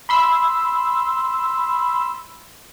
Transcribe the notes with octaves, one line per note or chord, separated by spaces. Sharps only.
B5 C6 E6